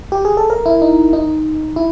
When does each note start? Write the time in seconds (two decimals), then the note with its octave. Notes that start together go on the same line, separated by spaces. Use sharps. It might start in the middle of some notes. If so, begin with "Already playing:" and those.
0.12 G4
0.25 G#4
0.37 A4
0.50 A#4
0.66 E4
0.82 D#4
1.13 D#4
1.76 E4